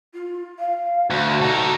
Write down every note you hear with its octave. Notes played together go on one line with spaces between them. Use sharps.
F4
F5
D2 F#4
D#4 A4